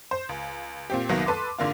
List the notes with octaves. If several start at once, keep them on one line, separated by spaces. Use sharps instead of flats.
C5
C#2
A#2 C4 G4
C2 D#3 F#3 A#3 B3
A4 B4 C6 D6
G#2 D3 A#3 F4